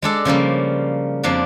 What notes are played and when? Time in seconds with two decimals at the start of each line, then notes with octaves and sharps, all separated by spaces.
0.02 G#3 D4 A4
0.25 C#3 F3 G3 A#3
1.24 F2 F3 A#3 D4